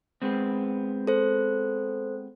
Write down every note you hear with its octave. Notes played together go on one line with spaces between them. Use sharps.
G#3 B3 C4
A4 C5